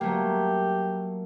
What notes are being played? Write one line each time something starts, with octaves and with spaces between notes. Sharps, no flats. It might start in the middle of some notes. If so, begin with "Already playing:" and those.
F#3 A3 A#3 G4